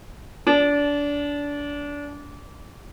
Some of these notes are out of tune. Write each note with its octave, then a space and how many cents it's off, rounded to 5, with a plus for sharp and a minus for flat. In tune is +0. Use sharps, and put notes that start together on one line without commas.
D4 -25